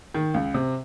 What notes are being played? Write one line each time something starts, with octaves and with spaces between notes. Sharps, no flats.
D#3
C#2
C3